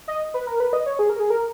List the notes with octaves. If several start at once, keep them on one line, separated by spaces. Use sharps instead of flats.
D#5
B4
A#4
B4
D#5
C#5
G#4
A#4
G#4
A#4